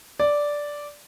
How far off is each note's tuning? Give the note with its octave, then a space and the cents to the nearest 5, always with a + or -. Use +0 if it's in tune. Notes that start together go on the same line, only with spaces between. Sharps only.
D5 -5